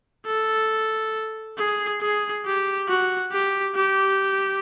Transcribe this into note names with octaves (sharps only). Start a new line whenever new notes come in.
A4
G#4
G#4
G4
F#4
G4
G4